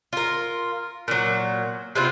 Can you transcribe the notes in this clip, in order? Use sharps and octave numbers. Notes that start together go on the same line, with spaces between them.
F4 A#4
A#2 F#3
C3 B3 C4 F4